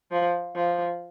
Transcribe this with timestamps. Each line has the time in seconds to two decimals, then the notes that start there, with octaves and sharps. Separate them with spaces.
0.12 F3
0.55 F3